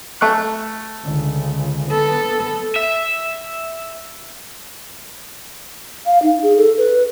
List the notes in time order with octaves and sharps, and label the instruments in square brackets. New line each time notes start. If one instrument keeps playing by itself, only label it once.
[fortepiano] A3 C#6 F#6
[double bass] C#2 [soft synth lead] D3
[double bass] B3 [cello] A4
[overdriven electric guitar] E5
[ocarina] F5
D#4
G#4
A4
B4